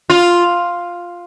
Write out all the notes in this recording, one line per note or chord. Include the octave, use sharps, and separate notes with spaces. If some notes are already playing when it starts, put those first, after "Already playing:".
F4